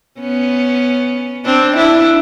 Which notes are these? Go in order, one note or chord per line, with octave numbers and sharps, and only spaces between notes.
B3 C#4
C4 D4
D4 E4